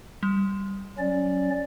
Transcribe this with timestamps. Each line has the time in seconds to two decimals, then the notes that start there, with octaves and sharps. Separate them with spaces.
0.23 G3
0.98 F#3 C#4 D5